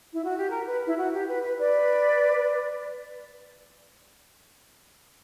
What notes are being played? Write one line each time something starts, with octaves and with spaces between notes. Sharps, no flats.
E4
F#4
G4
A#4
B4
E4
F#4
G4
B4
B4
B4 D5